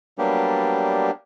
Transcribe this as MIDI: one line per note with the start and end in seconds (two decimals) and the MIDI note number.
0.18 1.11 54
0.18 1.11 55
0.18 1.11 58
0.18 1.11 59
0.18 1.11 62
0.18 1.11 67